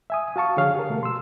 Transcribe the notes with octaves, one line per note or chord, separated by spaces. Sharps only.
E5 G#5 D#6
F#4 F5 A5 C#6
D3 F3 G#4 C#5 F5
G4 A#4
B2 A3 F#4 A#4
C6 E6